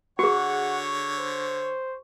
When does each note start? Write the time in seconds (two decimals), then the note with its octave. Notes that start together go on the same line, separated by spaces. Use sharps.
0.19 D3 F#4 G#4 C#5 F#5 C#6
1.19 C5